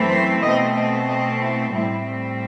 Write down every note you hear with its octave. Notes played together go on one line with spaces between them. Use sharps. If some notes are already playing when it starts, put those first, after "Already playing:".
Already playing: F#2 E3 A3 C4
C5
B2 A3 C4 D#5
D#5
D#5
E4
A2 G3 C4 E4